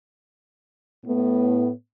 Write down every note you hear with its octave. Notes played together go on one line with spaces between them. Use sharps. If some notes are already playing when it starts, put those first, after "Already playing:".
A2 B3